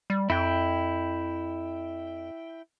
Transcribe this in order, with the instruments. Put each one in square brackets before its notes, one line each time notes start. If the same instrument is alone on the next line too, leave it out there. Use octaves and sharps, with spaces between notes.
[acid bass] G3
[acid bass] F2 [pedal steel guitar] E4 G5